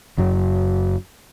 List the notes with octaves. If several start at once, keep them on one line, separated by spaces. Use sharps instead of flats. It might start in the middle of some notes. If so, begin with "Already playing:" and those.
F#1 F#2 F#3